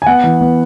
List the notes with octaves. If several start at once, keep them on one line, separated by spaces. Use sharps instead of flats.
G#5
B3 F#5
E3
B3